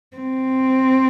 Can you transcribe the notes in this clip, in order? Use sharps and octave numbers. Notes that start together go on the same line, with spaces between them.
C4